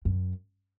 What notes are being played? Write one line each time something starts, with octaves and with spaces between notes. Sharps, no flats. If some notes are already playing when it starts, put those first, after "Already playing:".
F#2